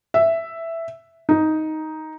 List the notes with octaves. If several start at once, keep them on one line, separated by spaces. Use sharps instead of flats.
E5
D#4